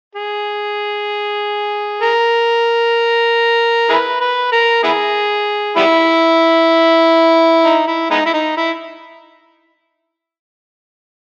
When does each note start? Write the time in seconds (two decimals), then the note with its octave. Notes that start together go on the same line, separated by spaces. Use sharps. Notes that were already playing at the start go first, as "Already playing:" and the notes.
0.15 G#4
2.02 A#4
3.89 E4 G#4 B4
4.20 B4
4.52 A#4
4.83 B3 E4 G#4
5.77 G3 B3 E4
7.64 D#4
7.88 E4
8.10 G#3 B3 D#4
8.26 E4
8.33 D#4
8.57 E4